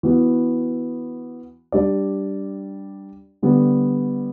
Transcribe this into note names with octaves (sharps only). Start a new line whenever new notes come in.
E3 B3 F#4
G3 D4 G4 D5
D3 G3 B3